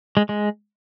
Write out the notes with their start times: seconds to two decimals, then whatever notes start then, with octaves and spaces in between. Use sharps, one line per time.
0.17 G#3
0.29 G#3